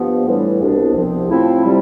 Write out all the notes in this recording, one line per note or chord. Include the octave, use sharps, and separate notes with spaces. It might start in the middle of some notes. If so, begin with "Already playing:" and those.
Already playing: G2 F3 B3
A2 E3 G3 D4
C2 B2 B3 D4
C2 C3 F3 B3
A2 F3 C4 E4
C3 G3